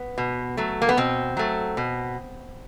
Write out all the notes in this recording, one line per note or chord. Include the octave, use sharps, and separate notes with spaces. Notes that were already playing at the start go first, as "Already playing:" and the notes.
Already playing: B3
B2
F#3 A3
A#3
B3
B2 C4
F#3 A3
B2